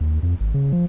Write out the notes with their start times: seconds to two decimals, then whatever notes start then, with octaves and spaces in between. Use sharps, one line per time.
0.01 D#2
0.23 F2
0.40 G#1
0.54 C#3
0.72 F3